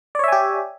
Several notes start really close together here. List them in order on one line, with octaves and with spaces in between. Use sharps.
D5 C#5 E5 G#5 G4